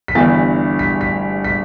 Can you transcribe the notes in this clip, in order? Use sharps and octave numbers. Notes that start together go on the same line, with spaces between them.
B6
G1 G2 E3 A6
B6
B6
B6